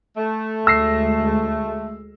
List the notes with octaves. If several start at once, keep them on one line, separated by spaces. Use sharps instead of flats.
A3
D2 G#3 E6 A#6 C7